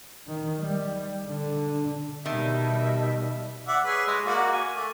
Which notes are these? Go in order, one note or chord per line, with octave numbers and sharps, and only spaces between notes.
D#3
G3
D3
B2 D#3 G3 D#5 E5 A5 B5
D5 E5 F#5
G#4 B4 C#5
G#3
A#3 F#4 D5
G#5
A3